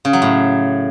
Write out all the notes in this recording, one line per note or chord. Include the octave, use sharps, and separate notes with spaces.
C#3
F#3
A2